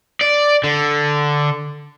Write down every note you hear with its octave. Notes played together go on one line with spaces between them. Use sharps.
D5
D3